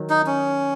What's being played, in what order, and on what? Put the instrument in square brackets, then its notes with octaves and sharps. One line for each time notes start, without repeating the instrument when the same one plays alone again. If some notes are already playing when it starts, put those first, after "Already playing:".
Already playing: [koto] D#3 F#3
[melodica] D#4
C#4